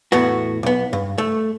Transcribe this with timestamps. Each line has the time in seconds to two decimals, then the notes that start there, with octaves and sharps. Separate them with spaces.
0.12 E2 A2 B3 F#4
0.63 B1 B3
0.93 G2
1.18 A3